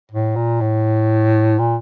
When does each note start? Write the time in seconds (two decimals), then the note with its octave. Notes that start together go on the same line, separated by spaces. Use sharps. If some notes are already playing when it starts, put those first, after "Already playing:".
0.11 A2
0.36 A#2
0.61 A2
1.59 A#2